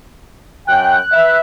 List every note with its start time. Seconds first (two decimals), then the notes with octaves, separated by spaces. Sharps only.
0.68 F#2 G5 F#6
1.12 B4 E5